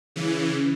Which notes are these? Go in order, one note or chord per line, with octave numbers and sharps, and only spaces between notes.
C#3 E3